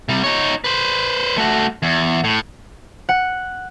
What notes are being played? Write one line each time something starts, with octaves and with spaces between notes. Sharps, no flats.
C3 G3
D#4 C#5
B4 C5
A3 F#4
E2
A2
F#5